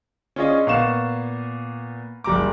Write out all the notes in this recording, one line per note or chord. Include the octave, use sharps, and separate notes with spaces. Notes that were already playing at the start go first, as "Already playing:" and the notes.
C#4 D4 F4 G#4 C#5 D#5
A#2 B3 F5 C#6 E7
F#1 G3 A#5 D6